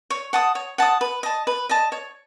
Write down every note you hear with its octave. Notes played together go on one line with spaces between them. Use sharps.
C#5
F#5 A5 D#6
C#5
F#5 A5 D#6
B4
D#5 A5
B4
D#5 A5
C#5